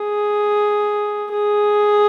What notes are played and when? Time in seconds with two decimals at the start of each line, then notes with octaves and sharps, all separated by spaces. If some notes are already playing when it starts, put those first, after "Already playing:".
Already playing: G#4
1.33 G#4